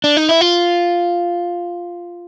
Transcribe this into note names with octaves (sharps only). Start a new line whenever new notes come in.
D4
D#4
E4
F4